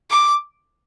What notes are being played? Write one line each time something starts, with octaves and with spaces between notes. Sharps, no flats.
D6